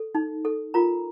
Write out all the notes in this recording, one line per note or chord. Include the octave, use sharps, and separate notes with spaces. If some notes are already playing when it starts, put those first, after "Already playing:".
Already playing: A4
D#4
A4
F4 A#4 A#5